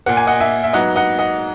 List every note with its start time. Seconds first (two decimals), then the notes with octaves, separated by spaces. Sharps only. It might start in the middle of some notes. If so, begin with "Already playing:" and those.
0.06 A#2 A#3 F#5
0.17 G#5
0.27 D#5 F#5
0.40 E5 G#5
0.64 E5
0.73 G#2 F#3 B3 D#5 F#5
0.96 D#5 F#5
1.19 D#5 F#5